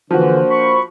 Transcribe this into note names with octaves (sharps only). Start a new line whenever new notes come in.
D3 E3 F3 A#3 D4 F#4 C5
B5 C#6